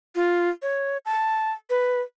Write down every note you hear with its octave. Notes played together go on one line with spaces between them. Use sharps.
F4
C#5
A5
B4